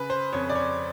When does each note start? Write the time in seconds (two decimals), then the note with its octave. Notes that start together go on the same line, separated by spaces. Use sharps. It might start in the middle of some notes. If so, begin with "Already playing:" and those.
Already playing: C#3 B4
0.10 C5
0.33 F2 C#5
0.49 D5
0.55 C#5